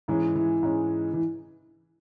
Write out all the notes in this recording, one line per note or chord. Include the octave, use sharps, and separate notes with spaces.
G#2 E3 G#3 C#4
E3
G#2 G#3 C#4
E3